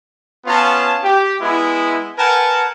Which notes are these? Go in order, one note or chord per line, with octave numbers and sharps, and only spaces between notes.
B3 C#4 F4 F5 A5
G4
G#3 B3 E4
A#4 B4 F#5 G#5 A5